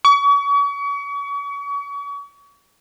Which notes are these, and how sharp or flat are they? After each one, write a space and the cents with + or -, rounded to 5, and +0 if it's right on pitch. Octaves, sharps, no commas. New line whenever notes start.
C#6 +40